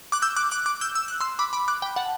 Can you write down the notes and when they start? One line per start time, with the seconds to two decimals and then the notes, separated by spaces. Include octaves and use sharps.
0.12 D6 F#6
0.22 E6 G6
0.36 D6 F#6
0.51 D6 F#6
0.66 D6 F#6
0.81 E6 G6
0.95 E6
1.08 F#6
1.20 C6 E6
1.39 B5 D6
1.53 B5 D6
1.68 D6 F#6
1.82 G5 B5
1.96 F#5 A5